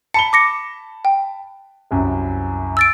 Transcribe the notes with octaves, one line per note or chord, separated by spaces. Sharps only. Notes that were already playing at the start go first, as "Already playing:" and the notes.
A5 B5 C#7 G7
D6 A#6 C#7
G5
C2 F#2
E6 A6 D7